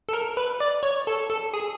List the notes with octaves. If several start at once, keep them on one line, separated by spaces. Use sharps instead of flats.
A4
A#4
B4
D5
C#5
A4
A4
G#4